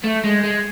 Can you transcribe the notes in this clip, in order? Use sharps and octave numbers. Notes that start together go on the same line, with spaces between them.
A3
G#3
G#3